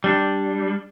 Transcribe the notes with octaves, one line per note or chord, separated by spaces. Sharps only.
G3 D4